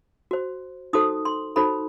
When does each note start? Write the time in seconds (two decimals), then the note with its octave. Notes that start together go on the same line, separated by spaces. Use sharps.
0.31 F#4 C5
0.93 D#4 F#4 A4 C5 D#6
1.25 C6
1.56 D#4 F#4 A4 C5 B5